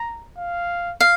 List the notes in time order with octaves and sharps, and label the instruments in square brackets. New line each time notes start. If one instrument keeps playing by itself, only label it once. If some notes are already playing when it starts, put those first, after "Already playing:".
Already playing: [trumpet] A#5
F5
[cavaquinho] F5